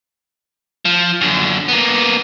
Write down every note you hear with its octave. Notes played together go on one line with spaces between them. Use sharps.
F3
F#2 D3
A#3 B3